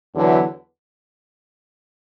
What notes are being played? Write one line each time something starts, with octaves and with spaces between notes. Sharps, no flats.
E2 D3 F#3 B3 E4